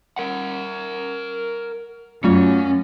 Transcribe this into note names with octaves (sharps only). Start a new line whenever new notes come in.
A#4 F#5
F#2 F#3 A3 C#4 F4